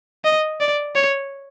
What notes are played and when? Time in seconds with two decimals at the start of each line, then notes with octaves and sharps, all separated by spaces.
0.25 D#5
0.60 D5
0.95 C#5